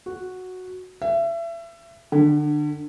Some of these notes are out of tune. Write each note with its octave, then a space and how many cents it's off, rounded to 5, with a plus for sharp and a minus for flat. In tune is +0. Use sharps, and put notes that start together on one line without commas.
F#4 -5
E5 +30
D3 +25